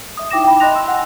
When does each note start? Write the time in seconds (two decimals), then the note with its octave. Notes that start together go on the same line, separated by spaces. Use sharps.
0.17 E5 D#6
0.31 D#4 E4 G5 D6 A#6 E7
0.44 G5 B5
0.60 D#5 A#5 C6 F#6 A#6 F7
0.74 C6 E6
0.88 F#5 G#5